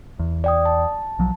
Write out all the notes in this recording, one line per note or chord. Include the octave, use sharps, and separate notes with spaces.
E2
D5 G5 D#6
A5
B1 F3 F#3